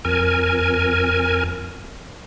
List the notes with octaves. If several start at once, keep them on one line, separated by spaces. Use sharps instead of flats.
F2 A#4 G#5